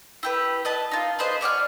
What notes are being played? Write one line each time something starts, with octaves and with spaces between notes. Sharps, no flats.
E4 G4 B4
B4 D#5 A5
D#4 F4
G#4 B4 C5 D#5
C#5 D5 F#5 F6